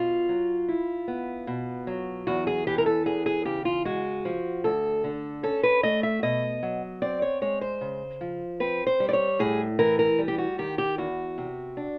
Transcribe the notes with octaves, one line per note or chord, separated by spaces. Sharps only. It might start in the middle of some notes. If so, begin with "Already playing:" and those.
Already playing: B2 F4
F#3
E4
B3
B2
F#3
E2 F#4
G#4
E3 G4
A#4
A4
E2 G#4
G#4
C#3 G4
F4
G#3 F#4
F3
D2 A4
D3
C#4 A4
B4
A3 D#5
E5
B2 D#5
F#3
C4 D5
C#5
G#3 C#5
C5
C#3
F3
C4 B4
C5
G3
D5
C#5
A2 G#4
E3 A#4
A#4
G3
G4
F#4
D#3 G4
G4
E2 F#4
C3
D4